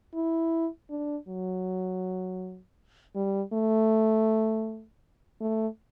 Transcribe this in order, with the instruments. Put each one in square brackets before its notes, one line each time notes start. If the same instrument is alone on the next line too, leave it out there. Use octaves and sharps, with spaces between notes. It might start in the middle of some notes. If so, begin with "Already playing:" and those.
[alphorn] E4
D4
F#3
G3
A3
A3